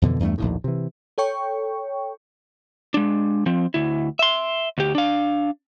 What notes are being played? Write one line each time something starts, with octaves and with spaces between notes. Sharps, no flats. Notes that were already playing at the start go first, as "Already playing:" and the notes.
F2 B2 D3 E3
E2 G2 A3
A#1 D#2 A2
C3 E3
A4 C#5 G5 C#6
G#3 D4
F3 C4
D2 E4
E5 C6
D2 G4
D4 F5